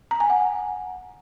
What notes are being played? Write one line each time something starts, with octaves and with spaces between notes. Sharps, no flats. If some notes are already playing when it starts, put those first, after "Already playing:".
A#5
G#5
F#5